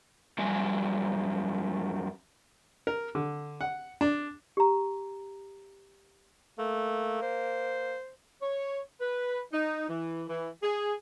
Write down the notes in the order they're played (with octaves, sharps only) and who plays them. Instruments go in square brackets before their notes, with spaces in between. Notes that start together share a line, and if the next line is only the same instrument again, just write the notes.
[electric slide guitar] F#2 F3 G3 G4 E5 G#5
[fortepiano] A#4
D3
F#5
D4
[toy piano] G4 A#5
[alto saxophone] A3 [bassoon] A#3
[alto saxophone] C5
[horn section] C#5
B4
D#4
E3
E3
G#4